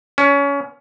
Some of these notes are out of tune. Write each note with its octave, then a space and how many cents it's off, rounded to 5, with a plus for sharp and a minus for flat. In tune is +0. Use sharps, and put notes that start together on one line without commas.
C#4 +25